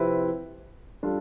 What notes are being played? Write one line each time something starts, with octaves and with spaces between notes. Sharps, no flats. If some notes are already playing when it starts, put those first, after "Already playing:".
Already playing: C3 F3 C4 E4 B4
G3 D4 F4 A4